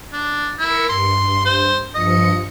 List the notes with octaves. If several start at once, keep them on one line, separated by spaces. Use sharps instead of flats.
D4
E4 A#4 C#7
G2 C6
C5
G2 F3 D#5 C#7